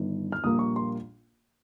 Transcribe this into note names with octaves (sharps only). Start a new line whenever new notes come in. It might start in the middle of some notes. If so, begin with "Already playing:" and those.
Already playing: G1 G2 D#3
F6
A#1 A#2 G3 A#3 D#6
C#6
C6